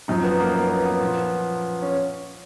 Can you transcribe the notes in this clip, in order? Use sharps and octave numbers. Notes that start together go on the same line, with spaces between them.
F#2 F3 D#4
B3
A#3
B3
B3
B3
A#2 F3
C#4